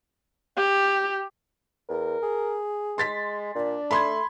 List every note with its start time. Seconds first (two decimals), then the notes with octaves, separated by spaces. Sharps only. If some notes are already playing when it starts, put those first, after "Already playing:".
0.57 G4
1.90 E2 A#4
2.23 G#4
2.98 G#3 C6 A6 B6
3.55 A#2 D4
3.91 A3 B5 C6 G#6